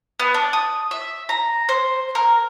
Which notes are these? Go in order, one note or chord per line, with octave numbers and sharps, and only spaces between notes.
B3
D4
D#6
E5
A#5
C5
A#4